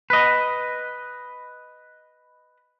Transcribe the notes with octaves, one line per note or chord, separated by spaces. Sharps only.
B4 D#5